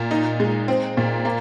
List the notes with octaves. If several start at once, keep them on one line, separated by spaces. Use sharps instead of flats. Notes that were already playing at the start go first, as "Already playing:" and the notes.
Already playing: A#2
D#4
G#3
C4
A#2
A#3